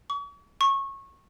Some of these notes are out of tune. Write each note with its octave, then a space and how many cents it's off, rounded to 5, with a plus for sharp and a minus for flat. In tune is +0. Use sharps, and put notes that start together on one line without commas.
C#6 +40
C#6 -20